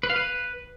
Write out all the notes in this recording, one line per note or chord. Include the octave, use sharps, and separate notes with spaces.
B4
F5
B4